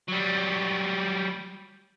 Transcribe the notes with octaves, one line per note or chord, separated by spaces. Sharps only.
F#3 G3